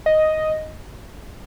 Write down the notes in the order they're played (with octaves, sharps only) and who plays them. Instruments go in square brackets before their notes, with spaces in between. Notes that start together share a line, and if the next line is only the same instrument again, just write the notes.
[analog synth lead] D#5